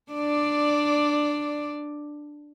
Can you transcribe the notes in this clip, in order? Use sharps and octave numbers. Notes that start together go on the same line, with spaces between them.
D4 D5